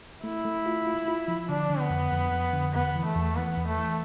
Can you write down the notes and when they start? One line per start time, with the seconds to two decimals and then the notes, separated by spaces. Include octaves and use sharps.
0.24 A3 E4
0.45 A3
0.66 F4
0.87 F4
1.08 F4
1.28 F3
1.49 D3 D4
1.71 D3
1.80 B3
1.90 F2
2.12 F2
2.32 F2
2.54 D3
2.74 E2 B3
2.95 E3
3.05 A3
3.15 E2
3.36 E3 B3
3.57 E2
3.67 A3
3.78 E3